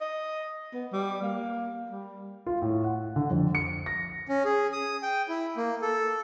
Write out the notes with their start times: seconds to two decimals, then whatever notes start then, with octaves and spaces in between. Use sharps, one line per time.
0.01 D#5
0.73 B3
0.92 G3
1.22 A#3
1.90 G3
2.46 F4
2.62 A2
2.84 F#5
3.16 D3
3.30 F2
3.55 C#7
3.86 A#6
4.29 C#4
4.45 G#4
4.73 D#6
5.02 G5
5.29 E4
5.57 A#3
5.82 A4